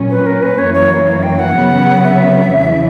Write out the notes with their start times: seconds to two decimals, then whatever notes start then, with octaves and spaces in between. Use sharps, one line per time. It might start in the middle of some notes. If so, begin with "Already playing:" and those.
Already playing: A#2 F#3 C#4
0.11 B4
0.26 A#4
0.42 B4
0.58 F#2 E3 A#3 C#5
0.74 C#5
1.07 C#5
1.23 G5
1.39 F#5
1.55 C#3 F#3 B3
2.04 E5
2.52 E2 C#3 E3